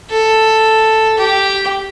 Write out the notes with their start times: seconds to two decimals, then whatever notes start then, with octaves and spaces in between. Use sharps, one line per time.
0.11 A4
1.18 G4